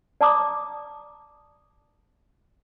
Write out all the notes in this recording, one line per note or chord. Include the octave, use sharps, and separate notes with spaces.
D5 A5 A#5 D6 D#6